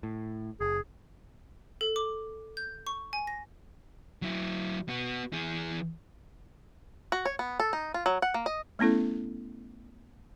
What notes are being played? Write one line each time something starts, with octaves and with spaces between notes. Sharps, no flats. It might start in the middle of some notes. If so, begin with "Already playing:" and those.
A2
F#1 G#4
A4
D6
G6
C#6
G#5
A#6
F#3 E4
B3 F#4
E3 G#4
F#4
C#5
B3
A4
D#4
F4
F#3
F#5
A#3
D#5
A3 B3 C#4 E4 A4